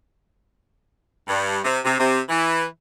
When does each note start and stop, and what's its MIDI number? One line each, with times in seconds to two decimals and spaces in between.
1.28 1.59 43
1.65 1.78 48
1.85 1.95 48
2.00 2.20 48
2.29 2.65 52